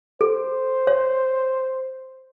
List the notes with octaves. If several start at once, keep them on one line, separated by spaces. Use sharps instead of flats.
A4 C5
C#5